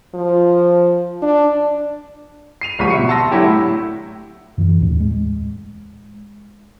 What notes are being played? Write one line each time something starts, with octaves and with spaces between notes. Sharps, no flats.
F3
D4
C7 D#7 F7
D1 C2 F3 C#6 B6 D#7
B2 E5 C#7
A5 C6 E6 A#6
D3 F#3 E4 G4
A2
F#2 E3
D#2 A2
G#3